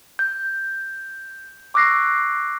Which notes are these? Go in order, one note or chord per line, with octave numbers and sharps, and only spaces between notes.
G6
C#6 D6 E6 F#6 A#6 C7